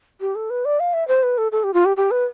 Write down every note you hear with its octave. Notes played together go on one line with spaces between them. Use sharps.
G4
A4
B4
D5
F5
E5
C5
B4
A4
A4
G4
F4
G4
G4
B4